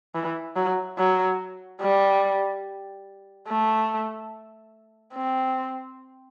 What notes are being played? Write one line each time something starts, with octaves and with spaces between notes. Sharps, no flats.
E3
F#3
F#3
G3
A3
C4